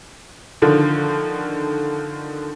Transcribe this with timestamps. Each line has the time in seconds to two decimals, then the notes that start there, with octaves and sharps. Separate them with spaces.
0.62 D3 D#3 F3